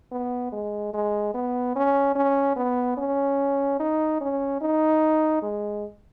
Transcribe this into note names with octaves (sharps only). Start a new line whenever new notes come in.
B3
G#3
G#3
B3
C#4
C#4
B3
C#4
D#4
C#4
D#4
G#3